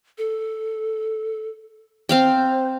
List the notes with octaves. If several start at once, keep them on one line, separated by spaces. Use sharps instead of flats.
A4
C4 C5 F5 G5